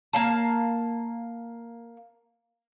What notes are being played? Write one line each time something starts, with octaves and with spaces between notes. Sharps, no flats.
A#3 F5 A5